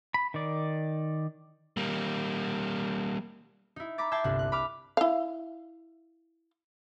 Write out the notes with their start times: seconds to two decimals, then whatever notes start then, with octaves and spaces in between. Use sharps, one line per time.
0.14 B5
0.34 D#3 D5
1.77 G3 A#3
3.76 D#4 E4
3.98 A#5 B5 D6 A6
4.11 E5 G5 A5 G#6 A6 C7
4.24 G1 C2 D4 F#6
4.39 F#6
4.52 B5 D6 F6
4.97 E4 F5